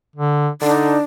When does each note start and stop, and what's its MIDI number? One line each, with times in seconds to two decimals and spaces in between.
0.16 0.49 50
0.62 0.96 50
0.62 1.03 62
0.62 0.97 63